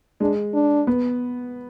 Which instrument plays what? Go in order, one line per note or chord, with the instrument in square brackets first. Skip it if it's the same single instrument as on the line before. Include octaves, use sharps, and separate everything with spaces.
[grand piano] G#3 [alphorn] D4
[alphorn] D4
[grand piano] B3